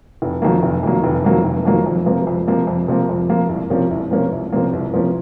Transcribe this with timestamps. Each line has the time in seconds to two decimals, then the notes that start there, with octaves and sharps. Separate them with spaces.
0.22 F1
0.42 F2 D#3 F#3 A#3
0.63 F1
0.83 F2 D#3 F#3 A#3
1.04 F1
1.25 F2 D#3 F#3 A#3
1.44 F1
1.65 F2 D#3 F#3 A#3
1.86 F2
2.06 C3 F3 A#3
2.27 F2
2.48 C3 F3 A#3
2.67 F2
2.88 C3 F3 A#3
3.09 F2
3.29 C3 F3 A#3
3.49 C2
3.70 C3 F3 A#3 C#4
3.91 C2
4.11 C3 F3 A#3 C#4
4.32 C2
4.52 C3 F3 A#3 C#4
4.73 C2
4.94 C3 F3 A#3 C#4